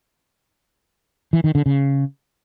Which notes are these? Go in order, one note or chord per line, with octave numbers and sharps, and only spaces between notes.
E3
D#3
D3
C#3